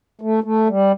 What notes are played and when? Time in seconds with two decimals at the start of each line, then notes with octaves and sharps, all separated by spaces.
0.21 A3
0.44 A3
0.68 G3